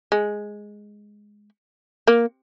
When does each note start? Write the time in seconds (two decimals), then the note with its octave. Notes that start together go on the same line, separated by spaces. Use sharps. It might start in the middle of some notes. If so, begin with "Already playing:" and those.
0.12 G#3
2.07 A#3